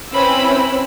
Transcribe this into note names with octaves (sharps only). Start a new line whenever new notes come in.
C4 C#4 E4 B4 B5 E6